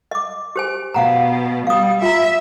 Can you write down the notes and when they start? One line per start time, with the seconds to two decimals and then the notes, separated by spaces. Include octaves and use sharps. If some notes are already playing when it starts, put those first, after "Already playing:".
0.11 D#5 D6
0.56 G4 C5 G#5
0.94 B2 F5 F#5 A#5
1.67 G3 F5 D#6
2.02 F4 E5 A#5